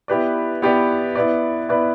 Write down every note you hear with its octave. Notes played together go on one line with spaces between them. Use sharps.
B3 E4 G4 B4 D5
B3 E4 G4 B4 D5
B3 E4 B4 D5
B3 E4 B4 D5